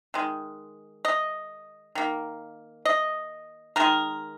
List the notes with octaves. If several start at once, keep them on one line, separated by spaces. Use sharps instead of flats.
D#3 G#3
D#5
D#3 A#3
D#5
D#3 G#3 A#4